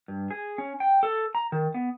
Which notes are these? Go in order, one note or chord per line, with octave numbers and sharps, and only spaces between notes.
G2
G#4
C#4
G5
A4
A#5
D#3
B3